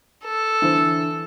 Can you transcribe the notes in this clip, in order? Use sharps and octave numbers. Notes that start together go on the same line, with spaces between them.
A4
D3 E3 C5